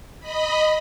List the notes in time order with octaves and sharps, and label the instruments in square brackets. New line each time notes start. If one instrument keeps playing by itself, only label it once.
[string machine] D#5 B5